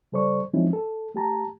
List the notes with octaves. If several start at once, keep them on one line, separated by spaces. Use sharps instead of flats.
C#3 G3 A4 C5 D5 C#6
F3 G#3 C4 C#4 D#4 E4
A4
A3 G4 A5 A#5